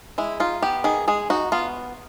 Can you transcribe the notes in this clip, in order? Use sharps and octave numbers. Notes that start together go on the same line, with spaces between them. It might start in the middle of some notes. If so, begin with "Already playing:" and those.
G#3 E4
D#4 F4
B3 G4
D#3 G#4
G#3 G#4
D#4 F#4
B3 F4